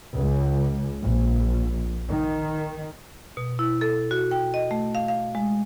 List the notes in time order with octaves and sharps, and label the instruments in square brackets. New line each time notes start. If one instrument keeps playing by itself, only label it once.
[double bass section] C#2
A#1
D#3
[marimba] B2
E4
A4
F#4
G5
D#5
A3
F5
F5
G#3